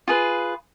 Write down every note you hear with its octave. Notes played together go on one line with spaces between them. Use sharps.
F4 G#4 B4